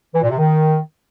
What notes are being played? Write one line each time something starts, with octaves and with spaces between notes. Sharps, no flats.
E3
A#2
C3
D#3